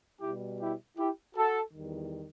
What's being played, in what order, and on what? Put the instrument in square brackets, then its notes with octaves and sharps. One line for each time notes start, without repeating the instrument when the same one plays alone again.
[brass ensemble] B2 G3 E4 G4
E4 G4
E4 G4
F#4 A4
E2 D#3 G3